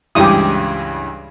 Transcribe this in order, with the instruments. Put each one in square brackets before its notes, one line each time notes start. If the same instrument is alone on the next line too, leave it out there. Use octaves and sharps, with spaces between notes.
[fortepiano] C#2 G2 E3 [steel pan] G4 D#6